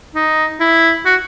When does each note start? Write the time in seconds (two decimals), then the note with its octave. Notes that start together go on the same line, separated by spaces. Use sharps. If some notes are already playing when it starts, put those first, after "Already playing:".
0.15 D#4
0.60 E4
1.05 F#4